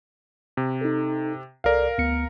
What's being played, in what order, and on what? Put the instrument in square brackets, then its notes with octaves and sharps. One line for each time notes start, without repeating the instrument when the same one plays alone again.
[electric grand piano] C3
[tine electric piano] D#4 A4
[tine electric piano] C2 A4 D5 [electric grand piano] A#4 F5
[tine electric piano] D2 B3 C#7